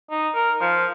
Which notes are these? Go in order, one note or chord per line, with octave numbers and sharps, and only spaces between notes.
D#4
A#4
F3